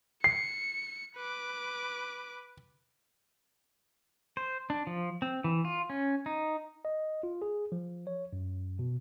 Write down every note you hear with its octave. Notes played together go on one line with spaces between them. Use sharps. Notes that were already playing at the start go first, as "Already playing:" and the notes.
C7 C#7
B4 D6
C5
D4
F3
C4
E3
F4
C#4
D#4
D#5
F4
G#4
F3
C#5
F#2
B2